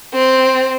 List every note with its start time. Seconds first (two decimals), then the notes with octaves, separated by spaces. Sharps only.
0.14 C4